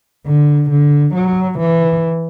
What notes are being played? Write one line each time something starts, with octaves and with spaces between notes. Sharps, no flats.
D3
D3
F#3
E3